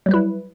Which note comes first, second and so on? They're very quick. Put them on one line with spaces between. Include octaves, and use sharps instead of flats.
F#3 G3 B4 E4